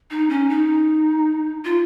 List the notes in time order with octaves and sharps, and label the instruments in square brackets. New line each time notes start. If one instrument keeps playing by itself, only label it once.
[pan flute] D#4
C#4
D#4
F4